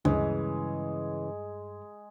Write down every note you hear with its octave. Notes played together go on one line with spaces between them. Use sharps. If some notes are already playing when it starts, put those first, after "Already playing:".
D2 G2 C#3 E3 G#3